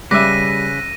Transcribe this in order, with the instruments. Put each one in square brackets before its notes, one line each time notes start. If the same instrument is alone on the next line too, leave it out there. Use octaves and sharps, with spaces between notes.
[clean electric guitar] C#3 B4 [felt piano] G3 [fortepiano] E5 D6 [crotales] A#6 D#7